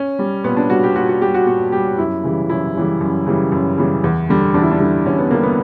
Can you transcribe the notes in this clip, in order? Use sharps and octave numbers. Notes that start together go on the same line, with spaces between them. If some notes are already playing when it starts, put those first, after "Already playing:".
Already playing: C#4
G3
A#2 B3
D4
G3 F#4
G4
A#2 F#4
F#4
G3 G4
F#4
A#2 F#4
G3 G4
F#2 E4
C#3 E3 G3
F#2 E4
C#3 E3 G3
F#2
C#3 E3 G3
F#2
C#3 E3 G3
E2
D3 G3
E2 D4
E4
D4
D3 G3
E2 C#4
B3
D3 G3 A#3
B3